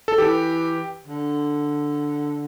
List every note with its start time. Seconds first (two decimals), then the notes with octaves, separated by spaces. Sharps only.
0.08 A4
0.18 E3 G4
1.07 D3